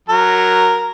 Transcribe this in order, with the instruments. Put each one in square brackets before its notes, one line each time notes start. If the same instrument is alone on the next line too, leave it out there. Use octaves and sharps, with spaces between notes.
[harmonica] F#3 A#4